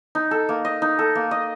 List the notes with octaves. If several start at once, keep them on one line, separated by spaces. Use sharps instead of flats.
D#4
A4
A#3
D#5
D#4
A4
A#3
D#5